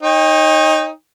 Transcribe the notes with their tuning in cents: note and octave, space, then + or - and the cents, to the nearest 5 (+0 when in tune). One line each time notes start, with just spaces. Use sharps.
D#4 +5 C#5 -35 G5 +35